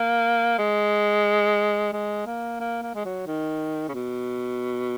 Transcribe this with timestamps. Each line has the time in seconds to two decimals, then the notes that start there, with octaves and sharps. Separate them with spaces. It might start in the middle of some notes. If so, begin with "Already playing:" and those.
Already playing: A#3
0.59 G#3
1.93 G#3
2.26 A#3
2.60 A#3
2.82 A#3
2.95 G#3
3.05 F#3
3.27 D#3
3.89 C#3
3.94 B2